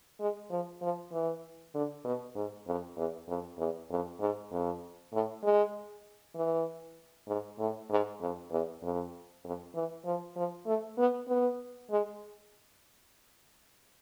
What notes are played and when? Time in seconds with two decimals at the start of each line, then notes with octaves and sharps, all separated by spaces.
0.20 G#3
0.50 F3
0.82 F3
1.12 E3
1.74 D3
2.04 B2
2.35 G#2
2.67 F2
2.97 E2
3.28 F2
3.58 E2
3.90 F2
4.20 G#2
4.51 F2
5.13 A2
5.43 G#3
6.36 E3
7.28 G#2
7.59 A2
7.90 G#2
8.20 F2
8.51 E2
8.82 F2
9.44 F2
9.75 E3
10.05 F3
10.36 F3
10.66 A3
10.98 B3
11.28 B3
11.91 G#3